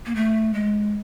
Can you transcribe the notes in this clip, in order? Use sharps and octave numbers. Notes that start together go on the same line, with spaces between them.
A#3
A3
G#3